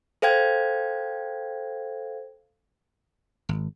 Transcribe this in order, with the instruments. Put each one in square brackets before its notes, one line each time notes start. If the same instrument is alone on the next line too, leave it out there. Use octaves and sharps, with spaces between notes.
[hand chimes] A4 C5 F5 G5 G#6
[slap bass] G#1